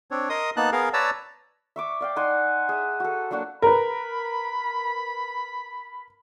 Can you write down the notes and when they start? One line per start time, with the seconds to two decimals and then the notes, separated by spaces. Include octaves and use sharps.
0.11 C4 D4 C#5
0.29 A#4 D#5 C6 D#6
0.57 A#3 B3 D#4 A5 F#6
0.72 B3 G#4 A#4 F5
0.93 B4 C#5 D5 A5 A#5 E6
1.76 E5 C#6 D6
2.01 D5 F5 G5
2.16 D#4 F#5 G#5 C6
2.69 G#4 E5
3.00 F#4 A4
3.31 F#3 A#3 D4 F#4
3.62 A#4 B4 B5